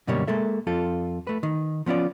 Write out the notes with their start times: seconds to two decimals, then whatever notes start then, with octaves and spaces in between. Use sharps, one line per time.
0.07 F#2 B2 D3 G3 A#3 C#5
0.28 G#3 A#3 A4 E5
0.67 F2 F4 A4
1.27 A3 B4
1.43 D#3
1.86 F3 B3 C#4 F4 D5